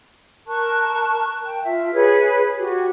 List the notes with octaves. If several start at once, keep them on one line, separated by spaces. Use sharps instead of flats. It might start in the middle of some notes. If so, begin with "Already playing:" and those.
A#4 A5 C#6 F#6
G5
F4 E5
G#4 B4 C#5 G#6
F#4 G4